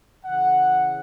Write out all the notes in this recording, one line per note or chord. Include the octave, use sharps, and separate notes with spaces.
C#3 E3 F#5